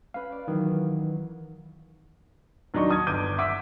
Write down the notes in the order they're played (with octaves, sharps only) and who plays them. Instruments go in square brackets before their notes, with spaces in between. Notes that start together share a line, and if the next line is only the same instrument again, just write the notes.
[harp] C#4 B4 [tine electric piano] F5
[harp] D5
[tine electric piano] D#3 E3 [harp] F#3
[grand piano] D#2 F#3 D4 D#4 D5 C#6
A5 D#6 G#6
G1 D6 G6 D#7
E5 F#5 D6 E6 B6